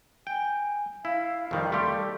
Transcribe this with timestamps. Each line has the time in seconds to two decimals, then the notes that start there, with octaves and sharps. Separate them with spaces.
0.27 G5 G#5
1.05 E4 F5
1.51 F2 D#3 G3
1.72 G3 A3 G4 C6
1.96 A4